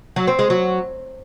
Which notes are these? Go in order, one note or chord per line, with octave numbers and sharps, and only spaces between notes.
F#3
C4
G#3
F#3